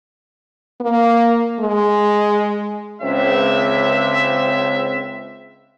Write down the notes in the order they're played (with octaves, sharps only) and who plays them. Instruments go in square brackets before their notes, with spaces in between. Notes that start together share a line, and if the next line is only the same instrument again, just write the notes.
[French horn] A#3
G#3
[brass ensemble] C#2 C4 E5